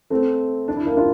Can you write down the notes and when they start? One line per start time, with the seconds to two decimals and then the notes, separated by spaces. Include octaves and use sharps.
0.10 A3 C4
0.68 D4
0.77 E4
0.86 A#3 D4
0.97 D4 F4